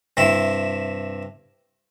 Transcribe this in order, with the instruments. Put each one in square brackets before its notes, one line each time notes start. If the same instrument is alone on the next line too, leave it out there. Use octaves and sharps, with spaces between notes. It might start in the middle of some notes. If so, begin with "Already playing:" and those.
[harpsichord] G2 C3 E4